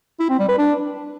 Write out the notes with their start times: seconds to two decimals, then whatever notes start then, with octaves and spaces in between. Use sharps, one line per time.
0.20 E4
0.29 C4
0.39 G3
0.49 B4
0.58 D4